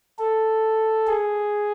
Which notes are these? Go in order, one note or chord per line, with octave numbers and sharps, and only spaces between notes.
A4
G#4